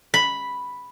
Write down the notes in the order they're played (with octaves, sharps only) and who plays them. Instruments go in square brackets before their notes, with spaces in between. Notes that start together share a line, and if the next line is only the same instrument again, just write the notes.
[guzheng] B5